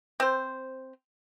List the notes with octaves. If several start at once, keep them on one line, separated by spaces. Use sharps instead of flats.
C4 C5